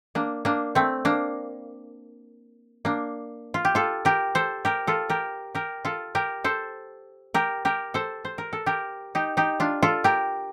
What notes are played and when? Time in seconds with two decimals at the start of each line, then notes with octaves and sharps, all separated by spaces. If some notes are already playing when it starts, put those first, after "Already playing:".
0.15 A#3 D4
0.45 A#3 D4
0.75 A3 C4
1.05 A#3 D4
2.85 A#3 D4
3.54 F4
3.65 G4
3.75 F4 A4
4.05 G4 A#4
4.35 A4 C5
4.65 G4 A#4
4.87 F4 A4
5.10 G4 A#4
5.55 G4 A#4
5.85 F4 A4
6.15 G4 A#4
6.44 A4 C5
7.34 G4 A#4
7.65 G4 A#4
7.94 A4 C5
8.25 C5
8.38 A#4
8.53 A4
8.66 G4 A#4
9.15 D#4 G4
9.37 D#4 G4
9.60 D4 F4
9.82 F4 A4
10.04 G4 A#4